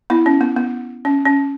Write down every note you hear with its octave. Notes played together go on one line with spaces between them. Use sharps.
B3 E4
C#4
B3
B3
C#4
C#4